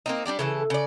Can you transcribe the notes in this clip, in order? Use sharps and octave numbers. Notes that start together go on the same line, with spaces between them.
A#3 C4 D#4
G3 D4 G4 D5
C#3 E3 A4
C#3 D5